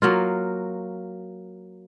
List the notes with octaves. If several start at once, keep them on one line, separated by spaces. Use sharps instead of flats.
F#3 A#3 F4